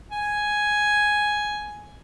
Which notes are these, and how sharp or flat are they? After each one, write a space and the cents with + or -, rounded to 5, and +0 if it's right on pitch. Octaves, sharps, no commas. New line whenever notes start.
G#5 +5